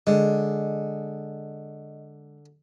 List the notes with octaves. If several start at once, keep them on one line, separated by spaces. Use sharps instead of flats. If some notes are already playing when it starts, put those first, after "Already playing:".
D3 G#3 D#5